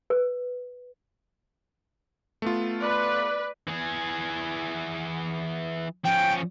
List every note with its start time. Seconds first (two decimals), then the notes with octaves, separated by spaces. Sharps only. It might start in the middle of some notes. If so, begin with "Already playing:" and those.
0.10 B4
2.42 A3 B3 F4
2.81 B4 D5
3.68 E3 G#4
6.05 F3 C#4 G5